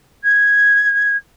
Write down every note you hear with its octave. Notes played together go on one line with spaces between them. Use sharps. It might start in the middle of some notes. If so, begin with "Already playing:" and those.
G#6